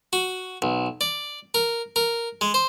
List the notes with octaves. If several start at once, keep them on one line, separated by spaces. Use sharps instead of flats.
F#4
B1
D5
A#4
A#4
G#3
C5